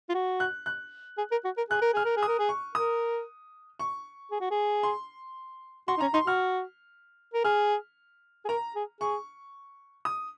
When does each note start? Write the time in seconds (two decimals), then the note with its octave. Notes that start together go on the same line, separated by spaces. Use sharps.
0.09 F4
0.14 F#4
0.40 F#6
0.66 F#6
1.18 G#4
1.32 A#4
1.45 F#4
1.57 A#4
1.70 G#4 F#6
1.82 A#4
1.94 G#4 F6
2.05 A#4
2.17 G#4
2.23 D#6
2.28 A#4
2.39 G#4
2.49 C#6
2.75 A#4 D#6
3.79 C#6
4.31 G#4
4.40 F#4
4.51 G#4
4.83 C6
5.88 F#4 C6
5.97 D#4
6.01 C#4 A#5
6.14 D#4 C6
6.27 F#4 F6
7.34 A#4
7.44 G#4 F6
8.45 G#4
8.48 A#4 A#5
8.75 G#4
9.01 G#4 C#6
10.05 D#6